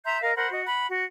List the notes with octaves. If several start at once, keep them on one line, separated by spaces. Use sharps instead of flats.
E5 A#5 C6 G6
A#4 D#5 F5
A#4 C5 F#5 B5
F#4 D#5
F#5 B5
F#4